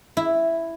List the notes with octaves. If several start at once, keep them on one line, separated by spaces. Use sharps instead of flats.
E4